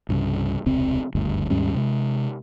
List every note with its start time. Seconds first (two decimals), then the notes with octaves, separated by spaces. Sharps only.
0.09 C2 G2 C#3
0.66 E1 C#2 C3 C4
1.15 F#1 D2 G2
1.50 D#2 G#2 G3 C#4
1.75 C3 G#3